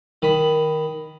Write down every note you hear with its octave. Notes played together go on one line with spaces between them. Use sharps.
D#3 B5